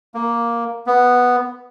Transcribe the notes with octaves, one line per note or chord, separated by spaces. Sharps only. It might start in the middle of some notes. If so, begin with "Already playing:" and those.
A#3
B3